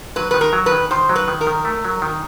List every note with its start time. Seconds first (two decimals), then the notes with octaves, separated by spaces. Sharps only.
0.16 F#3 B4
0.31 D#3 B4
0.41 A#4
0.53 F#3
0.66 B4
0.72 D#3
0.91 D#3 C5
1.09 F#3
1.16 B4
1.28 D#3
1.41 A#4
1.47 D#3
1.65 A3
1.85 F#3
2.02 D#3